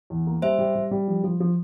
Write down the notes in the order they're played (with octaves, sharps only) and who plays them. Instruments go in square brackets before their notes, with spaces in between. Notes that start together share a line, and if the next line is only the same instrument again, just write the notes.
[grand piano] E2
A#3
[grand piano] G3 [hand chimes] C5 E5
[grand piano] G3
G3
G3
F3
F3
F3